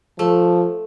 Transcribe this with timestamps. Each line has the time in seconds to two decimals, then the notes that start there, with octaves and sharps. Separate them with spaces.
0.19 F3 A3